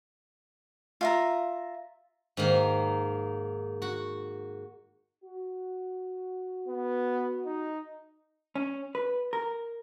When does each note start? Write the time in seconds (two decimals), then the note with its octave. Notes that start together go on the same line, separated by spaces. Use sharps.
1.01 F4 E5 A#5
2.37 G#2 D#3 A#3
3.82 F#4
5.23 F#4
6.68 B3
7.45 D#4
8.56 C#4
8.95 B4
9.33 A#4